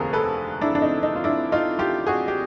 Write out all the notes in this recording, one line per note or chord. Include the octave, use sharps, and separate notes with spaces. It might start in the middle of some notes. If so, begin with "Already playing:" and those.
Already playing: F1 D#2 D3 F3 G#4 A#4
A4 B4
D4 E4
D4
D#4
D#4
F4
D4 E4
D#4 F4
F4 G4
F#4 G#4
G4